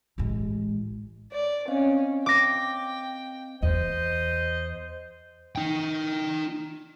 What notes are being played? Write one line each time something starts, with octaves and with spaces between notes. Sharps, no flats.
A1 G#3
C#5 D5
C4 C#4 D#5 F5
G5 D6 A#6
E2 C5 D#5
D#4 G5